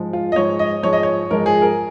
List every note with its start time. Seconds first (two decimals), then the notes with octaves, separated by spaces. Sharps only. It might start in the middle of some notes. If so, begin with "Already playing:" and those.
Already playing: G#2 F3 G#3
0.13 F4
0.32 D#5
0.36 G#2 F3 G#3 C#5
0.59 D#5
0.83 G#2 F3 G#3 C#5
0.93 D#5
1.03 C#5
1.31 G#2 F3 G#3 A#4
1.46 G#4
1.62 A#4